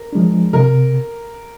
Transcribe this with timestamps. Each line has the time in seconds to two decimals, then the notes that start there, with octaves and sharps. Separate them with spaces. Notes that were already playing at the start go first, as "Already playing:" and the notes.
Already playing: A#4
0.13 F3 G#3 D4
0.53 C3 A#4